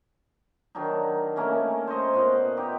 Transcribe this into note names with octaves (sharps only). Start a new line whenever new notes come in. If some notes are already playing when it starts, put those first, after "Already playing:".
D#3 F#3 D4 D#4
A3 A#3 C#4 E4
C5 C#5 D#5 C#6
A#2 B3 F#5 C6
D#4 G4